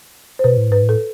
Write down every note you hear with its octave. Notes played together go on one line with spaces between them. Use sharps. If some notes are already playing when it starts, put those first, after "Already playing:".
C5
B2 B4
A2
G#2 B4
A2
A4